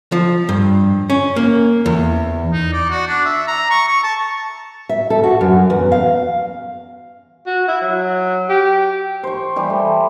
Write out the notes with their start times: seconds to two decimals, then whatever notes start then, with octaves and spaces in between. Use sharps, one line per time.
0.12 F3
0.49 G2
1.10 C#4
1.36 A#3
1.86 E2
2.53 D#4
2.73 D5
2.90 F#4
3.08 D4
3.25 E5
3.48 A#5
3.71 C#6
3.88 C#6
4.04 A5
4.89 E5
5.10 A4
5.24 F#4
5.41 F#2
5.70 E2
5.92 F5
7.47 F#4
7.68 E4
7.81 F#3
8.49 G4
9.24 C5 C#6
9.56 E3 G3 G4
9.70 A3